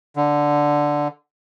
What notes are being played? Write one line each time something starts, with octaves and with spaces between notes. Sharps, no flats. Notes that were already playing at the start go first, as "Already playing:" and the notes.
D3